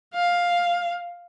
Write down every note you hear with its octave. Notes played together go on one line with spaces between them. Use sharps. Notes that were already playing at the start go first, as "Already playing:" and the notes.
F5